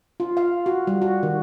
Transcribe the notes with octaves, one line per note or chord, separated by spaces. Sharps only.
F4
F5
F#4
G3
F#4
D#3